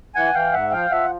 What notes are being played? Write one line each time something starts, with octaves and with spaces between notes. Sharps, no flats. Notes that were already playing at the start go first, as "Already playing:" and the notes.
E3 F#5 G#5
E3 F5 G5
G#2 E5 F#5
F3 F5 G5
F3 E5 F#5